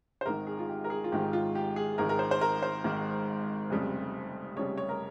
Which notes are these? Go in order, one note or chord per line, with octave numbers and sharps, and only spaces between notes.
C5
G#1 G#2 D#3 A#4
G#4
F4
G4
A#4
G#4
F4
G#1 G#2 D#3 G4
F4
G4
G#4
G#1 G#2 D#3 A#4
A#4
C5
C5
A#4
C5
G#1 G#2 D#3
F1 F2 C#3 G3
F1 F2 C#3 G3 C#5
C#5
A#4